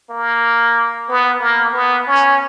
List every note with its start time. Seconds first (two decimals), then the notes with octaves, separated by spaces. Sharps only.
0.10 A#3
1.09 B3
1.40 A#3
1.73 B3
2.07 C#4